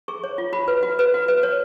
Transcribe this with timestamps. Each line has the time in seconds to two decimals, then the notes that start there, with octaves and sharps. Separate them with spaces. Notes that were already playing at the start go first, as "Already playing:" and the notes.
0.08 G#4 C#6
0.24 C#5
0.38 F4
0.53 F#4 B5
0.68 B4
0.83 F#4
0.99 B4
1.14 F#4
1.28 B4
1.43 C#5